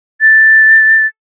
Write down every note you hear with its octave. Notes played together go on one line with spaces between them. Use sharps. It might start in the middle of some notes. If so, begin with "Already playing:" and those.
A6